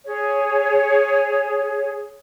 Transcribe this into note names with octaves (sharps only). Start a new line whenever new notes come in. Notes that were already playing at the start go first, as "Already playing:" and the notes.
G#4 C#5